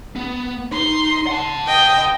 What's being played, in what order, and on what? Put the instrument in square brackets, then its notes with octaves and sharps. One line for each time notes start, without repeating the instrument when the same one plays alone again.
[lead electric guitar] B3
[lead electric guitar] D#4 [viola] C6
[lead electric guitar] F#5 A5
[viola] D#5 G5